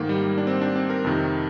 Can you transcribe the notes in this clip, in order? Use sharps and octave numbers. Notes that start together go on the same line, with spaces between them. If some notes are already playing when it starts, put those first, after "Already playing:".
Already playing: G#2 D#3 A#3
G3
A#3
D4
C4
D4
C4
A#4
F2 C3 D#3